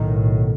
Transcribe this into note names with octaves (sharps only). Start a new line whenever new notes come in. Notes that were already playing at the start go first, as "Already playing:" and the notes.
Already playing: B1 A2 D#3